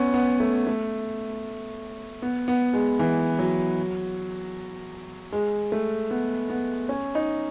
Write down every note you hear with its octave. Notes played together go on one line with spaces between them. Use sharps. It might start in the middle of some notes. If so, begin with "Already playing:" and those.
Already playing: B3 C#4
B3
A3
A3
B3
B3
G#3
E3
F#3
G#3
A3
B3
B3
C#4
D#4